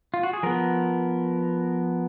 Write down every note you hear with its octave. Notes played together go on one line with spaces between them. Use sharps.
F4
F#4
G#4
F3 B3 A#4